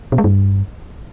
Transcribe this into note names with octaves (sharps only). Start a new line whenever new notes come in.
B2
G#3
G2